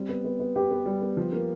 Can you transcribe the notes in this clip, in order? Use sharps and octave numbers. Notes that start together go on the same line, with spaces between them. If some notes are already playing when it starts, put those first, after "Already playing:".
Already playing: G3 C4
B3
B3
B3
B3 G4
B3
G3
B3
F3
A#3